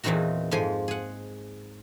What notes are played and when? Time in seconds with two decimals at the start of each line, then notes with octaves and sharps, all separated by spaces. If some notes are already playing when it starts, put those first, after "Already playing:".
0.04 E2 A#2 E3 C4 D#4 F#4
0.51 F2 G#2 F3 G#5
0.88 G#4 F#5